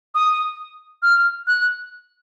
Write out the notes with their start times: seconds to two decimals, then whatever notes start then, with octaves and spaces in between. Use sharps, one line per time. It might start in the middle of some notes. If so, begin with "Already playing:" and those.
0.15 D#6
1.03 F6
1.47 F#6